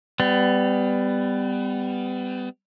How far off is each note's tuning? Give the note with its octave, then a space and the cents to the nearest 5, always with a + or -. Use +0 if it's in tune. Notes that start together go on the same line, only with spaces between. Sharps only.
G3 +15 B3 +30